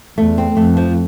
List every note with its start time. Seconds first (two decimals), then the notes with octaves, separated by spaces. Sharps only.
0.17 E2 A3
0.38 C4
0.57 F2 A3
0.77 F3